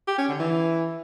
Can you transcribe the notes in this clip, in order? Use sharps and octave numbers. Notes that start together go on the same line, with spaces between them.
G4
C#4
D3
E3